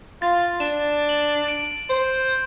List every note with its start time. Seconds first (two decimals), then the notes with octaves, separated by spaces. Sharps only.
0.22 F4 A6
0.60 D4 E7
1.09 F#7
1.48 D7
1.90 C5